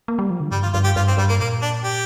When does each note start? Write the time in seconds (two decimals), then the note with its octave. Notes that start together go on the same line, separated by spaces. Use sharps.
0.08 A#3
0.19 G3
0.30 F3
0.40 D3
0.52 G2 G3
0.63 F4
0.74 G2 F4
0.84 G4
0.96 G2 F4
1.07 C4
1.17 G2 G3
1.29 A#3
1.40 A#2 A#3
1.62 D4
1.84 G4